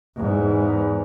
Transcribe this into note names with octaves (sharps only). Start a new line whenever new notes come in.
E2 G#2